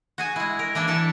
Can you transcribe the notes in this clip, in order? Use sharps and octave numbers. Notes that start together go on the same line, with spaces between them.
F#4 G#4 G#5
G#3 E4
A#4
E3 A#3 D4 E5
E3 A4 A5